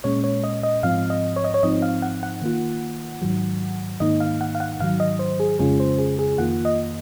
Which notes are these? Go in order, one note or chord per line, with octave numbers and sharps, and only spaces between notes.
A#2 G#3 C#4 C#5
C#5
D#5
D#5
G#2 F3 C4 F5
D#5
C#5
D#5
C#5
G#2 F3 C4 D#4 D#5
F5
F#5
F#5
D#3 A#3 F4
G#2 D#3 F#3
G#2 D#3 A#3 D#4 D#5
F5
F#5
F5
F#5
G#2 D#3 F#3 F5
D#5
C5
G#4
F2 C#3 G#3 C#4 F4 G#4
C5
G#4
G#4
F2 D#3 A#3 F4 F#5
D#5